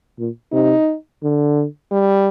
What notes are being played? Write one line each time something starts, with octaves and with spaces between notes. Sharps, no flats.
A#2
C3 D#4
D3
G3